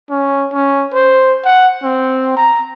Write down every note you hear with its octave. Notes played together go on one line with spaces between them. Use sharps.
C#4
C#4
C5
F#5
C4
A#5